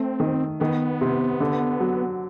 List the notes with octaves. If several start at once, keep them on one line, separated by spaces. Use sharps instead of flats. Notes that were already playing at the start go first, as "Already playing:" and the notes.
Already playing: A3 C4
D#3
D#3 B3
C3
D3
F#3